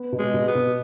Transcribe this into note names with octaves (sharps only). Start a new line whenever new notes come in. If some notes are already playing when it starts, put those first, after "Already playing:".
Already playing: B3
B2
G#3
B2
B3
B2